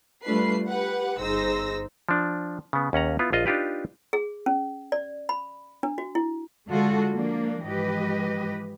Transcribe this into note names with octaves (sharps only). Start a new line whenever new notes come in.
G3 A3 D4 F4 B4 C7
G4 B4 F#5
G1 D#4 G#4 C5 E6 A#6
F3 D4
C#3 B3
D#2 C#4 F#5 A#5
B3 E4 F4
A#1 F4 D#5
D4 D#4 F4 G4 B4
G#4
C#4
D5
B5
D4
F#4
E4
D3 G#3 F4 F#4 A4
F3 A#3 D4
G#2 E3 F3 G4 B4 D#5